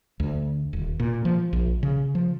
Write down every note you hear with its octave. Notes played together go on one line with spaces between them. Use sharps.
D2
D#1
A#2
F3
A#1
C#3
F3